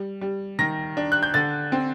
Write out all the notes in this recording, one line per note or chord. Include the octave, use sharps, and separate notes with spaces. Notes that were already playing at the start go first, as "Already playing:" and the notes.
Already playing: G3
G3
D#3 A#6
D4
F#6
G6
D3 A6
C4